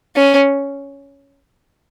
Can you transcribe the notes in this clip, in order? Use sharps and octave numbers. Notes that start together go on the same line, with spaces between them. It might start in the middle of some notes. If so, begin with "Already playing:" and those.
C#4